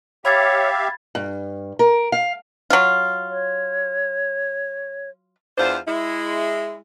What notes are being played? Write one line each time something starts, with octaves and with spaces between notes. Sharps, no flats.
G4 C#5 E5 F5 B5 G#6 A6
G2
A#4
F5
F#3 F4
C#5
E2 D4 F4 C5
G#3 E4